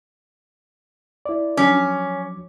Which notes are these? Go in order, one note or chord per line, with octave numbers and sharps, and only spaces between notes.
E4 D5
F3 F#3 C#4 D6